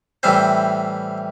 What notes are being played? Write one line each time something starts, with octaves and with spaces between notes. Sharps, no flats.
A2 E3 G3 C4 C5